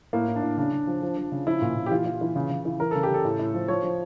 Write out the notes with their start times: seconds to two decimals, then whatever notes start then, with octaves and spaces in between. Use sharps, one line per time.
0.13 A2 A#3
0.28 A2
0.36 D4
0.42 A2
0.57 C#3 D4
0.73 C#3
0.87 F3
1.02 F3
1.17 F3
1.32 C#3
1.47 F3 E4
1.62 A#2
1.76 A#2
1.86 G4
1.91 E3 F4
2.06 E3
2.21 E3
2.36 C#3
2.50 C#3
2.65 E3
2.80 E3 A#4
2.91 C#3 A4
3.03 G4
3.10 C#3 A4
3.25 A2
3.39 A2
3.54 F3
3.68 F3 C#5
3.84 F3